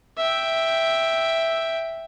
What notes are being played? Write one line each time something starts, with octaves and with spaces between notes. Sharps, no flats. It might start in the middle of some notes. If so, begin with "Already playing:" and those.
E5 G5